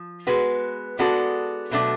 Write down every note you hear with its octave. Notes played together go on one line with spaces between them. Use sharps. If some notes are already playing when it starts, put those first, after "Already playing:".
Already playing: F3
G#3 B3 F#4 B4
G#3 B3 D4 F#4 A4
B2 F#3 A3 D4